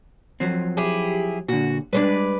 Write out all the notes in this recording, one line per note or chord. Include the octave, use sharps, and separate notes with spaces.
F3 F#3 C4
E4 G4 G#4
A#2 D3 F#4
G3 G#3 D4 B4 C5 D5